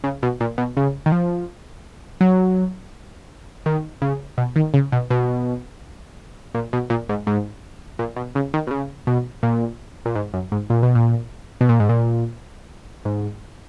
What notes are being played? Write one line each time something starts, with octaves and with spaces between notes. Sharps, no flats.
C#3
B2
A#2
B2
C#3
D#3
F3
F#3
D#3
C#3
B2
D#3
C#3
B2
B2
A#2
B2
A#2
G#2
G#2
A#2
B2
C#3
D#3
B2
C#3
B2
A#2
A#2
G#2
F#2
G#2
A#2
B2
A#2
B2
A#2
G#2
A#2
G#2